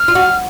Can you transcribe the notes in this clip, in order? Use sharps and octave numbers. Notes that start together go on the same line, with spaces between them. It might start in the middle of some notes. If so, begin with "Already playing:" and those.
Already playing: F6
F4
F#4